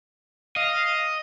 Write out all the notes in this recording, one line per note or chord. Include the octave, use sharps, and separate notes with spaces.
D#5 F5